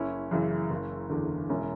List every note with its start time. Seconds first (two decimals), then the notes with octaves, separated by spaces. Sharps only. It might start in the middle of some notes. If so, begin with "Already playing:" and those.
Already playing: F#1 C#4 E4
0.31 F#2 C#3 E3
0.71 F#1
1.10 E2 D3
1.49 E1 C#4 E4